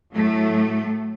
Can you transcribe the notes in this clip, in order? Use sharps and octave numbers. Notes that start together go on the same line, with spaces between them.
A2 F#3 A3